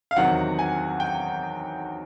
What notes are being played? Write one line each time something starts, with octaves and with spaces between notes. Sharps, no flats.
F5
E2 C3 D#3 F#3 F#5
G#5
G5